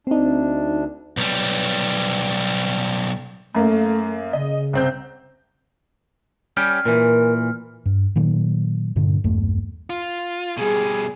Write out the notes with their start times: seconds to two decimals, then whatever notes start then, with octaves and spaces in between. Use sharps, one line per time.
0.07 D2 C4 D4 D#4
1.17 B1 G3
3.55 F#2 A3 A#3
4.33 C#3 D#5
4.73 C2 C4 G6
6.57 G3 C#4 G5 F6
6.85 A#2 E3 A#4
7.86 G2
8.16 A#2 D#3 F#3
8.96 G2 A#2 D3
9.24 B1 E2 G2 A3
9.90 F4
10.57 B2 G3 G#4